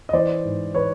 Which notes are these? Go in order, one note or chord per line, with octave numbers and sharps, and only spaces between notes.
D#5
E3 C5 D5
G#2
E3 B4 C#5